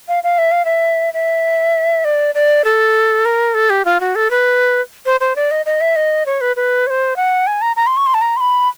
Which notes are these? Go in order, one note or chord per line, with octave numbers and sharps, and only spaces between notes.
F5
F5
E5
F5
E5
E5
D5
D5
A4
A#4
A4
G4
F4
F#4
A4
B4
C5
C5
D5
D#5
D#5
E5
D#5
C#5
B4
B4
C#5
C5
F#5
G#5
A#5
A#5
C6
C#6
C6
A5
A#5
C6
B5